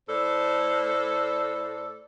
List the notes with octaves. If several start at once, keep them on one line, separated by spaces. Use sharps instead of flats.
A2 A4 C5 D5